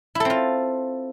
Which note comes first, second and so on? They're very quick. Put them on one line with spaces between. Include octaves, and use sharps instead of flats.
E4 A4 C4 F4